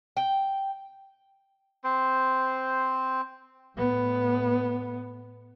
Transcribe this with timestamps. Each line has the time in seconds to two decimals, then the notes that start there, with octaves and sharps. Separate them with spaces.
0.17 G5
1.84 C4 C5
3.77 A2 B3